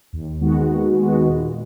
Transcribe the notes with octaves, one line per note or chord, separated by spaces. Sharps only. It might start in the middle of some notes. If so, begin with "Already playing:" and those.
D#2
D#3 G#3 B3 F#4
D#2
D#3 G#3 B3 F#4
A#2